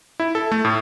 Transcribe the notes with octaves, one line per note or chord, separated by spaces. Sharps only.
E4
A4
A3
A2